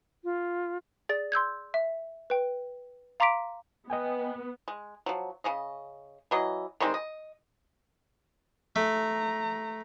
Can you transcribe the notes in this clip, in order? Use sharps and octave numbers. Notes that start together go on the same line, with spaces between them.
F4
G#4 D5 A6
C6 E6 G6 G#6
E5
B4 G5
F5 A#5 C6 D6 B6 D7
B3 D#5 G5 G#5
G#3
F3 F#3
C#3 C#4 D#5
E3 F#3 D#5
D#3 G3 G#3 C4
D#5
A3 A#5